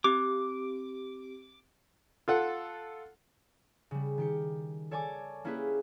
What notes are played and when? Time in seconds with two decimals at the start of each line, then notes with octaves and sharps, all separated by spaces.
0.04 C4 G4 D6
2.28 F4 A4 F#5
3.91 C#3 G3
4.18 D#3 G4 C#7
4.91 A4 C#5 D5 G#5 A5 D6
5.44 A#3 C#4 E4 G4 G#4 B4